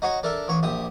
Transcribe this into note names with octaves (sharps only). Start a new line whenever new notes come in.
D#4 F#4 C#5
D4 A4 A#4 E5
A1 C#5
A#1 G4 E5 D#6